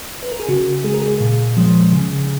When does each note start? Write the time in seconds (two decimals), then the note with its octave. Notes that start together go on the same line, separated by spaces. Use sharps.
0.23 B4
0.32 A#4
0.40 G#4
0.49 C#3 F#4
0.84 G#3 G#4
0.94 A#4
1.02 G#4
1.20 A#2
1.57 F3 G#3
1.92 C#3